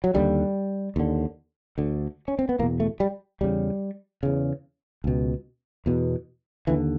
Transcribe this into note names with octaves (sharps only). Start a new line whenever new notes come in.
F#3
D#2 D3 G3
D#2 D3
D2 D3
C#4
C4
B3
E2 B2 A#3
A3
G3
E2 C#3 G3
E2 C#3
C#2 B2
E2 B2
D#2 D3 E3